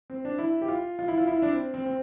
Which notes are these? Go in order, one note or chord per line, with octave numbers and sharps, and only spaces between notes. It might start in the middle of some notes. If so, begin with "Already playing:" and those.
C4
D4
E4
G4
F4
F4
E4
F4
E4
D4
C4
C4
C4